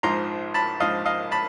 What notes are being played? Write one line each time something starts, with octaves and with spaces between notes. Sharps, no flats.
A#1 G#2 F3 A#5 C6
A5 B5
A#1 G#2 F3 D#5 F5
D#5 F5
A5 B5